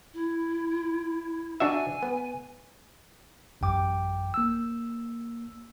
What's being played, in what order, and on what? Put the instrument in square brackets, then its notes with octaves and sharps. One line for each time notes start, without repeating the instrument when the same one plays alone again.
[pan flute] E4
[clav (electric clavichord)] D4 F#4 E5 [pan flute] G#5
[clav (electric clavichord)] B3
[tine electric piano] A1 F#2 G5 D6
A#3 E6